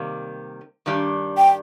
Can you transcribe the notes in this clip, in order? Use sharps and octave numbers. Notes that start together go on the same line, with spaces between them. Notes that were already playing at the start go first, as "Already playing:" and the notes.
Already playing: C3 D#3 G3 A#3
G2 D#3 G3 D4
G5